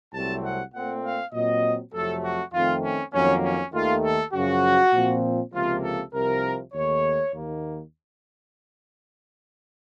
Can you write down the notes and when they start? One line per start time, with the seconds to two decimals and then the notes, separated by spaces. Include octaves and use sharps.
0.13 C2 C3 F#3 A3 C4 A5
0.43 F#5
0.73 A#2 A3 C4 F#5
1.03 F5
1.33 A#2 F#3 C4 D#5
1.93 F2 C3 F#3 A3 A4
2.24 F#4
2.53 F2 D#3 A3 C4 F4
2.84 C#4
3.13 F2 D#3 F#3 A#3 C#4
3.44 C#4
3.73 D#2 D#3 A3 F4
4.03 A4
4.34 F#2 C#3 F3 F#4
4.93 A#2 F3 C4
5.54 C#2 C3 F3 A#3 F4
5.83 A4
6.14 C2 C3 F3 A#4
6.74 D#2 D#3 A3 C#5
7.34 D#2 D#3 A#3